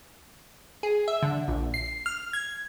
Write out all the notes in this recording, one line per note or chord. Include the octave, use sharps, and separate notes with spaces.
G#4
E5
D3
A#1
C7
F6
G#6